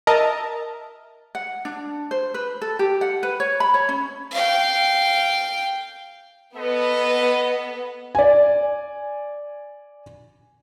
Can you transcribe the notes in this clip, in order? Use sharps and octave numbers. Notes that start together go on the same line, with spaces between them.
A#4 D#5 E5 A5 A#5
F#5
D4
C5
B4
A4
G4
F#5
B4
C#5
B5
C#5
C#4
F5 G5
B3 A4 B4 D#5
D5 G#5